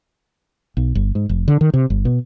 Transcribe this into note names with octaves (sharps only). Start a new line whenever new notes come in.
B1
G1
G#2
F1
D3
D#3
C3
G1
B2